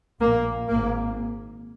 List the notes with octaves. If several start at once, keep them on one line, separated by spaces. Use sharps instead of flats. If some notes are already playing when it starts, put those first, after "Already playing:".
A#1 A#2 A#3
G#1 G#2 A#3